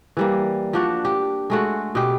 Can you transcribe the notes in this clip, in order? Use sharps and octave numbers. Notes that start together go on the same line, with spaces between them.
E3 G3 A#3
F3 D4 F#4
G4
G#3 A3 F#4
B2 G4